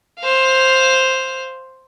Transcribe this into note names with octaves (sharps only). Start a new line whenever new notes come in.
C5 F5